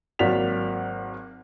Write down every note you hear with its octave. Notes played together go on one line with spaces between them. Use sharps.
G#1 F#3 A#3 D5 B6 F7